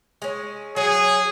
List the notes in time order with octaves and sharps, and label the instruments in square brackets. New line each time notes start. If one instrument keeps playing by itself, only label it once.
[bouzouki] G#3 C#4
[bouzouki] F#3 [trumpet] G#4